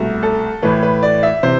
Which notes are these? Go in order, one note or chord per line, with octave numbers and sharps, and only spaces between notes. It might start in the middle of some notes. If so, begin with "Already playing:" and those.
Already playing: C2 B2 A3
A4
A2 E3 A3 B4
B4
D5
E5
C3 E3 C5